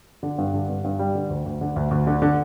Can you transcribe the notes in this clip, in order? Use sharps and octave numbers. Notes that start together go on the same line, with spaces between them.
D3
G2
D3
G2
G2
G3
D3
D2
D2
D3
D2
D2
D3
D3